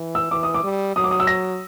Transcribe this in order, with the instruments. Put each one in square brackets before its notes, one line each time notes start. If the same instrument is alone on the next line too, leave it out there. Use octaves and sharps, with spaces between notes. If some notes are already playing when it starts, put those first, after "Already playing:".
Already playing: [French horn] E3
[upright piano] E6
[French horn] E3 [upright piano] D6
[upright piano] D#6
D6
[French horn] G3
[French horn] F#3 [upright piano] D#6
[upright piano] D6
D#6
E6
A#6